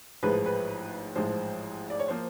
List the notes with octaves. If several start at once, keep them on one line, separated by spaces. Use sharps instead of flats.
A1 G#2 F3 G#3 B4
B4
A1 G#2 F3 G#3 C5
D5
C#5
F3 A#3 C5